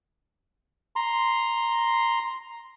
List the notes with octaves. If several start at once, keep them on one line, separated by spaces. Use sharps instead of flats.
A#5 C6